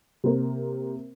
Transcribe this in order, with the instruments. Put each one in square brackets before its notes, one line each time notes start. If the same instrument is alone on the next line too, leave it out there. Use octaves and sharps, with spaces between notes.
[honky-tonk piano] C3 A#3 C4 A#4